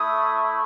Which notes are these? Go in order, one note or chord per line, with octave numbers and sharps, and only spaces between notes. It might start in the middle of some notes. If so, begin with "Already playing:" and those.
Already playing: A3 E4 D#6